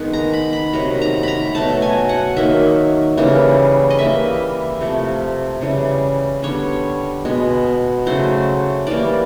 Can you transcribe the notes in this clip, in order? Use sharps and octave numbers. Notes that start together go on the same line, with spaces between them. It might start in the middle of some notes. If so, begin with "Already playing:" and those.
Already playing: D#3 G#3 B3
A#5
B5
B5
C3 D#3 F#3 A#5
A#5
A#5 B5
B2 F#3 A3 A5
G#5
F#5
D#3 F#3 A#3 E5
C#3 E3 G3 A#3
D#5
E3 G3 A#3 E5
C3 F3 A3
C#3 E3 G3
D3 G3 B3 C#5
B2 G#3 B3
C#3 F#3 A3 C5
E3 G3 A#3 D5